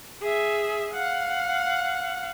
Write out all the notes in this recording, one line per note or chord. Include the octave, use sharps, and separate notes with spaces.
G#4 E5
F5 F#5